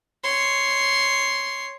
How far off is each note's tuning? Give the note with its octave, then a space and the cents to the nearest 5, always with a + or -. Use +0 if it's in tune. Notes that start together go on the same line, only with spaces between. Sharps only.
C#5 +0 C6 +0